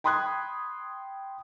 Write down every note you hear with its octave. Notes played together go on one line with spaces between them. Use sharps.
G5 B5 C6 D#6 F#6 G#6